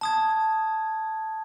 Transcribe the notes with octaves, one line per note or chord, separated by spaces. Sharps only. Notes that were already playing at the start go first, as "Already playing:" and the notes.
A5 D#6 G#6